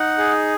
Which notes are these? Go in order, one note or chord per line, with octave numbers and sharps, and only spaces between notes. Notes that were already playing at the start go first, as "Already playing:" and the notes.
Already playing: D#4 F#5
G#4